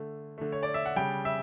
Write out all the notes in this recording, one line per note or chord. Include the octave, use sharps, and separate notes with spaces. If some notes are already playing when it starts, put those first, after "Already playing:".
Already playing: D3 A3
D3 A3
C#5
D5
E5
F#5
C#3 G3 G5
E5